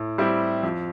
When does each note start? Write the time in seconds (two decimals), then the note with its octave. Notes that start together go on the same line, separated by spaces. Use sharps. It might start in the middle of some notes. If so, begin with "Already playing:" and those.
Already playing: A2
0.18 G3 C4 E4 G4
0.63 F2